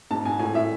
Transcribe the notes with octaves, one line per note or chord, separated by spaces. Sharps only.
G#2 A5
G#2 G#5
A2 G#5
A2 E5